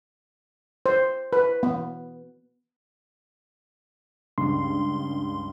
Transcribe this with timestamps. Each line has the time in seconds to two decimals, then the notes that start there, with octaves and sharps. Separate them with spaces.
0.86 C5
1.33 B4
1.63 B3
4.38 C#2 G2 C#3 C6